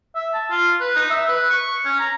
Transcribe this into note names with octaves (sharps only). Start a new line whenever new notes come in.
E5
A5
F4
B4
D#4
E5
B4
C#6
C#4
A#5